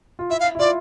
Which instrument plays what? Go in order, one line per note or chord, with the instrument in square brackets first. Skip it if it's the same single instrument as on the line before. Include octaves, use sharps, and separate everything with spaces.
[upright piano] F4
[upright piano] E4 [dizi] E5
[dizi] F5
[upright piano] E4
[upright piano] F4 [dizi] D5